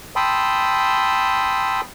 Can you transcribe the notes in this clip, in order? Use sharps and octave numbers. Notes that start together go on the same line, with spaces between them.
G5 A5 B5 C6 D#6 E6